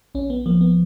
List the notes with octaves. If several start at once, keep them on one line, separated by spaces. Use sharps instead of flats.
A#1 C#4
B3
F3 A#3
B3